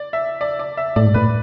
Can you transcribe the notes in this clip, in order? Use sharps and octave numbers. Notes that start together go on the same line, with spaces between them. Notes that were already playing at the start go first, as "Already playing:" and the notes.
Already playing: D5
E5
D5
D5
E5
A2 D5
G#2
A2 B4